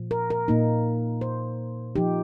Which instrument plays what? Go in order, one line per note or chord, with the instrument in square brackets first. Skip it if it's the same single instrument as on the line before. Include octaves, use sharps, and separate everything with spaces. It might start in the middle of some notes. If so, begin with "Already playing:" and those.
Already playing: [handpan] A#2 F3
A#4
A#4
A#2 A#3 D#4
C5
F3 D#4 G4